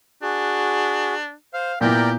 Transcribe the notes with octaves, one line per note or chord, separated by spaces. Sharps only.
D4 F#4 G#4
C5 F5
A#2 B3 E4 G4 A#4 D5 G5